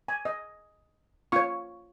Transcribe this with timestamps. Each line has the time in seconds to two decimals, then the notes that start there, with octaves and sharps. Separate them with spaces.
0.08 G#5
0.25 D#5
1.32 F4 C#5 C#6